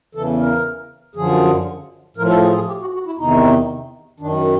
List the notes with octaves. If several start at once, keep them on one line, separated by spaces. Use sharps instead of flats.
E2 C#3 E3 A4
A#4
F#2 D3 F3 G#4
A2 F3 A#4
A4
G#4
G#4
G4
F#4
F#4
E4
E2 C3 D#3 D#4
F#2 D#3 D4